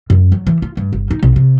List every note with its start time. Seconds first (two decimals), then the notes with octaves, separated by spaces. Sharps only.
0.10 F#2
0.32 F#3
0.47 E3
0.62 F4
0.77 G2
0.93 G1
1.11 D#4
1.23 B1
1.36 C3